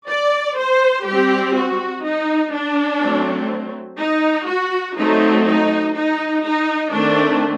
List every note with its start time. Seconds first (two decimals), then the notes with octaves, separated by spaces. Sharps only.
0.09 D5
0.58 C5
1.06 G3 C4 G4
1.56 F#4
2.04 D#4
2.53 D4
3.01 F#3 A3 C4
3.99 D#4
4.48 F#4
4.97 F#3 A3 C4 D#4
5.46 D#4
5.95 D#4
6.43 D#4
6.92 D#3 A3 C4 D4